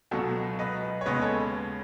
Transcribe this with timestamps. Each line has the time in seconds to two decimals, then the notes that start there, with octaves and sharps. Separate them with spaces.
0.11 C#2 B2 F#3 F#4 A4
0.59 B4 D#5
1.01 C#5
1.06 D#2 C#3 G#3 B3 B4 D#5
1.21 A4 C#5